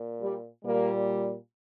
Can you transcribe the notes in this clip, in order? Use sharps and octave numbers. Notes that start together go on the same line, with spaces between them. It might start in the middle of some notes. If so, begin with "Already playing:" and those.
Already playing: A#2
G3
A#2 G3 A#3